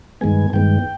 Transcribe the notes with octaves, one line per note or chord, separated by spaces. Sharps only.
G2 D#3 G#3 B3 G#5
G2 D#3 G#3 B3 G5